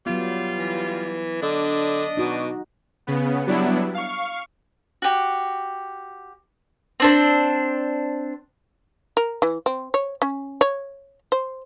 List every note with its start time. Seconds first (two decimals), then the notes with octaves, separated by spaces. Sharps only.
0.06 F#3 G3 B3 F4
0.59 E3
1.42 D3 D4 D#5
2.17 B2 D#4 F#4
3.07 C#3 B3
3.47 F#3 G3 B3 D4 E4
3.94 F5 C#6
5.02 F#4 G4
7.00 C4 D4 C5
9.17 A#4
9.42 E3
9.66 C4
9.94 C#5
10.22 C#4
10.61 C#5
11.32 C5